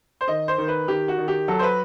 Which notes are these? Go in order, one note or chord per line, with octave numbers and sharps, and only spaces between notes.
C5
D#3 D#5
C5
D#3
B4
D#3 G4
F#4
D#3
G4
F#3 A4
C5
B4